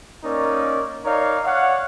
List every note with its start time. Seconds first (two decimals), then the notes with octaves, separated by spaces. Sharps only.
0.24 A#3 C#4 D#4 A#4 D5
1.04 D#4 A#4 C#5 D5 F5
1.44 C#5 D5 F5 F#5